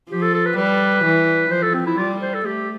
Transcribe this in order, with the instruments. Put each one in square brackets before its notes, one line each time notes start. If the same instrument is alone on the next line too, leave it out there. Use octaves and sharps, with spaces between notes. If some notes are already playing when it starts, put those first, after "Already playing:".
[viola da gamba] F3 [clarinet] G4
[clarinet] A4
A4
B4
[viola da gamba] G3 [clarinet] B4
[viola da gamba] E3
[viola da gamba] F3 [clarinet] C5
[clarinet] A4
C4
E4
[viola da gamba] G3 [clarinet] F4
[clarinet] C5
A4
[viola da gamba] A3 [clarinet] G4